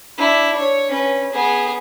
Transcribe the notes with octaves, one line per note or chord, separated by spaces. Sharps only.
D4 E4
C#5
C#4 B4
B3 G#4